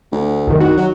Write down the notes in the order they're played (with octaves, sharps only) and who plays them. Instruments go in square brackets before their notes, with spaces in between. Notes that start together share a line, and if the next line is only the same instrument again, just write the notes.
[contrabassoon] D2
[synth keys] C2 F#2 D#3
[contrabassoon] D#3 [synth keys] F#4 F#5
[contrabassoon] F#3